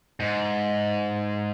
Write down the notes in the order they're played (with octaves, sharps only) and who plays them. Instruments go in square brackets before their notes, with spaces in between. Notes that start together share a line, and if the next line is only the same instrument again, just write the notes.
[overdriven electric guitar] G#2